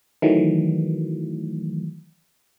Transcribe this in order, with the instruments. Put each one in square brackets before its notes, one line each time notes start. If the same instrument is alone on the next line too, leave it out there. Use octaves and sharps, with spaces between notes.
[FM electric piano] D#3 E3 F#3 A3